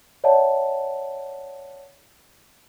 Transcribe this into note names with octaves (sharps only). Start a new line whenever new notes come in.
C#5 D5 E5 F#5 A5